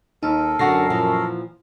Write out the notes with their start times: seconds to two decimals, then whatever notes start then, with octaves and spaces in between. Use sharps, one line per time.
0.23 D#2 D#4 A4 A#4
0.59 F#2 D3 F#4 F#5 C#6 A#6 C7
0.90 A#2 E3 F3